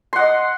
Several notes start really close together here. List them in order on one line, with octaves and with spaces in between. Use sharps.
C6 F#5 D#5